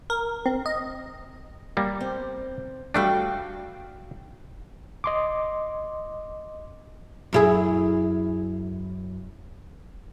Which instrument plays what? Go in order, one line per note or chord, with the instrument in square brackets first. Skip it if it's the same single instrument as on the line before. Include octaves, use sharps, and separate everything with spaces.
[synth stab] A#4
C4
D#5
[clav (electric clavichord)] G3 A#3
[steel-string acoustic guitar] C4
[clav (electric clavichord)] G3 A3 D4 [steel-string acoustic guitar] F#4 F5 G5
[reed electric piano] D#5 C6 D6
[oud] F#2 E4 G#4